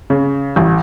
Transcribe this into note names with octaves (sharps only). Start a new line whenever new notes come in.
C#3
A1